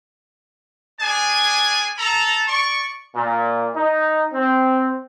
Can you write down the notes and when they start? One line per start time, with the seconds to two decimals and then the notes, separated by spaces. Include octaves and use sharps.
1.00 D4 G#4 G#5
1.98 A4 A5 A#5
2.48 D5 C#6
3.16 A#2
3.75 D#4
4.33 C4